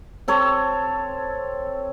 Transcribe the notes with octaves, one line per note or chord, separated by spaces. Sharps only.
C4 A4 C#5